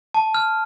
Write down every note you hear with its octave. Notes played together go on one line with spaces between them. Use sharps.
A5
F6